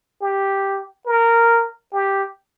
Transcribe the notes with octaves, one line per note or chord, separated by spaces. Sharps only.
G4
A#4
G4